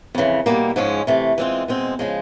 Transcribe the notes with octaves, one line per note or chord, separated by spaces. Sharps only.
F2 C#3 E3
B2 G3 A#3
G#2 F3 G#3 C#4
C3 E3 A3
E3 G#3 C4 F4
B2 G#3 C4
C#3 F3 G#3